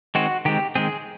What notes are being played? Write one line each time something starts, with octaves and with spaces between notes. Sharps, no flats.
D#3 G#3 C4 F#4
D#3 G#3 C4 G4
D#3 G#3 C4 G#4